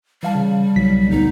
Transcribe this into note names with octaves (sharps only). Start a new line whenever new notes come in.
E3 G3 F5 A5
C#3
B1 F#3 B6
D2 B2 B3 D#4